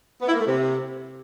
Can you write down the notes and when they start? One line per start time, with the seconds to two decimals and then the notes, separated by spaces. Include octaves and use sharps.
0.22 B3
0.28 E4
0.34 A#3
0.40 A3
0.46 C3